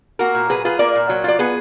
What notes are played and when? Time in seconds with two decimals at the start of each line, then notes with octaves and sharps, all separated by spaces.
0.19 A#3 F#4 A#4
0.35 A#2
0.49 F#3 G#4 B4
0.65 F4 G#4 B4
0.79 A#3 A#4 D5
0.95 A#2
1.09 F#3
1.24 F4 D5
1.39 B3 G#4 B4